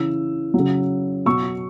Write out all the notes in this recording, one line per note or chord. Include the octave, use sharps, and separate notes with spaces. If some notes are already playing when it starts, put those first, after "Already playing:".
Already playing: C#3 E3 E6
C#3 F#3
B2 F#3 C#6 E6